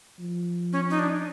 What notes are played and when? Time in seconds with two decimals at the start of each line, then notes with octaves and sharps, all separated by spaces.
0.19 F3
0.73 C#4
0.90 D#4
0.99 D4